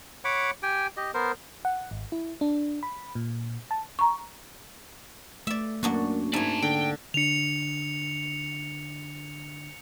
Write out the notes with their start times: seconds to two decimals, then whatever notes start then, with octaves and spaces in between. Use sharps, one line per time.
0.25 C#5 F#5 B5 D6
0.63 G4 G5 G#5
0.97 G4 D#5
1.14 B3 A#4 C5
1.65 F#5
1.91 G#1
2.12 E4
2.41 D4
2.83 B5
3.15 A#2
3.71 A5
3.99 A#5 C#6
5.47 A3 D5 E5
5.83 F#2 A#3 D4 F#4
6.33 G#2 D5 E5 G#5 A5
6.62 D3 G5
7.14 D3 D4 C#7 F7